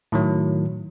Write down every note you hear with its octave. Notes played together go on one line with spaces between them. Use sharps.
A2 D#3 F#3